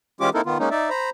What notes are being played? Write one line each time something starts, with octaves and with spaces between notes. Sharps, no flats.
E3 G#3 C#4 F4 G4 D6
A#3 C4 D#4 E4 A4 A#4
D#3 B3 F4
G#3 A#3 C#4 D#4
D#4 D5 E5
C5 A#5 B5